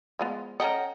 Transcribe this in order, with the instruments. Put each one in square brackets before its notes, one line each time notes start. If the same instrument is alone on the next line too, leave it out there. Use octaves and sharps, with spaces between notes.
[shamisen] F3 G#3 B3
[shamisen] C#4 A4 D#5 [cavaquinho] F#5 G5 A#5